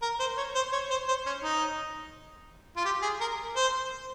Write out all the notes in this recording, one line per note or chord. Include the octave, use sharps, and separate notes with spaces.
A#4
C5
C#5
C5
C#5
C5
C5
C#4
D#4
F4
G4
G#4
A#4
C5